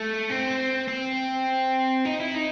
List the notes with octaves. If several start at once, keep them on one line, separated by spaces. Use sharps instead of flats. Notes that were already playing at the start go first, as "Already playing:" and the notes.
Already playing: A3
C4
C4
D#4
E4
D#4